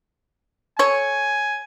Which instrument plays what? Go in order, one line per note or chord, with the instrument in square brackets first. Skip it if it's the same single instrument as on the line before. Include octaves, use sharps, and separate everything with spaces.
[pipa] A4 C#5 [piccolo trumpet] G#5